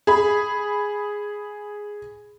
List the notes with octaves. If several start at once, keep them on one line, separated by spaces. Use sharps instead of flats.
G#4 B5